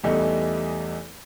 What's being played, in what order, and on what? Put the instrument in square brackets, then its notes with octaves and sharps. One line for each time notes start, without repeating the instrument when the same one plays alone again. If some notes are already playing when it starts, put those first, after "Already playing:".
[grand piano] E2 E3 G3 A3 D#4